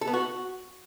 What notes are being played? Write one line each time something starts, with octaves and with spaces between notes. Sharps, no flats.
A4
B3
F#4